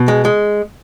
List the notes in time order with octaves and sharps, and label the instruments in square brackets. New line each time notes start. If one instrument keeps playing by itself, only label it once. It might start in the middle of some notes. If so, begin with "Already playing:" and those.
Already playing: [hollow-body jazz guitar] B2
G#3
G#3